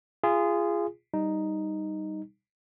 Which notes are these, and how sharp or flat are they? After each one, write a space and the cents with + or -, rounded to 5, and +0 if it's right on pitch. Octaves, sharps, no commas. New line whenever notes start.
F4 -25 G#4 -15
G3 +0 D#4 +0